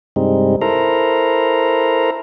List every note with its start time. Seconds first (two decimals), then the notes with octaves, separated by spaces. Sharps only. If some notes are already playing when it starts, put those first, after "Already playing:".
0.16 G2 C3 G3 G#3 C4 D#4
0.61 E4 A4 A#4 C5 A#5